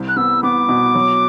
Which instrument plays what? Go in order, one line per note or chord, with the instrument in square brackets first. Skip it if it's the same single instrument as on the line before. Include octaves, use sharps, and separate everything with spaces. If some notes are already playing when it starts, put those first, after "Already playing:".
Already playing: [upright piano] C2 C3
[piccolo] F#6
[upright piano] B3 [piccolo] E6
[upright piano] B3 [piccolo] D6
[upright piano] B2
F#3